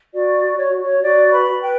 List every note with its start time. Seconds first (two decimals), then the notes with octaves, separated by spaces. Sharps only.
0.13 F#4 D5
0.43 F#4
0.57 C#5
0.72 F#4
0.84 C#5
1.02 F#4 D5
1.31 B4 B5
1.61 B4 G5